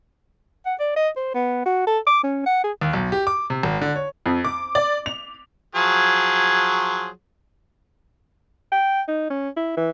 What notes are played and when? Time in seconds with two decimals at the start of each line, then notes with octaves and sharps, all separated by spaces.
0.66 F#5
0.80 D5
0.96 D#5
1.16 C5
1.34 B3
1.65 F#4
1.87 A4
2.07 D6
2.23 C#4
2.46 F#5
2.64 G#4
2.81 D#2
2.93 B1
3.12 G4
3.27 D6
3.50 C3
3.63 G#1
3.81 D3
3.96 C#5
4.26 F2
4.45 D6
4.75 D5
5.06 F7
5.75 F3 F#3 G#4
8.72 G5
9.08 D#4
9.30 C#4
9.57 E4
9.77 E3